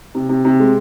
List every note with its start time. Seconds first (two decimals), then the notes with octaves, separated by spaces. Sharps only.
0.15 C3
0.29 C3
0.45 C3
0.60 G#3